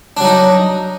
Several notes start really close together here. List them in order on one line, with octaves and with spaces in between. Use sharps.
D4 F#3 D#4